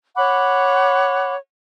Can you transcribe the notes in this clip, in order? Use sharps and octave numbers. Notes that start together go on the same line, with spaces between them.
C#5 F#5 B5 D6